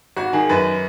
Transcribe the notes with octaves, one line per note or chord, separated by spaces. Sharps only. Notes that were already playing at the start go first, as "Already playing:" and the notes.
G#1 F#4
D#3 G#4
F#2 B4